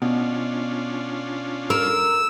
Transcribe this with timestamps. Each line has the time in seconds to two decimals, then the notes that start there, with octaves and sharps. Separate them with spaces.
0.02 B2 C#4 D4 F4
1.70 A#4 E6